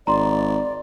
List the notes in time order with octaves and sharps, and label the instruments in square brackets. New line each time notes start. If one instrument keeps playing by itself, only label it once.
[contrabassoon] G#1 [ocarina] D5 [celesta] A#5 C6